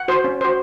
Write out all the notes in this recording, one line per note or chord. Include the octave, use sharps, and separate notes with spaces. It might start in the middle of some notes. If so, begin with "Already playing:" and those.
Already playing: F#5
F#4 C5
C#4
F#4 C5